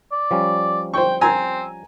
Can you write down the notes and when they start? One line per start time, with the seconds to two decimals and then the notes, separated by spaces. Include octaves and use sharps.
0.12 D5
0.31 F3 G3 C#4
0.94 C5 G5 C#6
1.21 C4 G#5 A#5